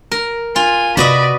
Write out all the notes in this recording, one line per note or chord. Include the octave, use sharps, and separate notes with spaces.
A#4
F4 G#5
C3 F#4 B4 D5 D#5 B5